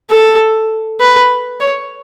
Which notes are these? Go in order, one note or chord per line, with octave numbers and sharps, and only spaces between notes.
A4
B4
C#5